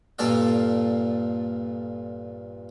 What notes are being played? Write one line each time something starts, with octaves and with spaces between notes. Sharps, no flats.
G2 A#2 A4 D5 F5